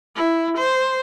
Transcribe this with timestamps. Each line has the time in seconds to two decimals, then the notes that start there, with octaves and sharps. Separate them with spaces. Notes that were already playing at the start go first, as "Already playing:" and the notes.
0.16 E4
0.57 C5